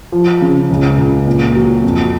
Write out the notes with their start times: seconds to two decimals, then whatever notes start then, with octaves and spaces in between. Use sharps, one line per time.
0.12 F3
0.41 C#3
0.70 C#2
0.98 C#2
1.27 A#2
1.55 F#3
1.83 F2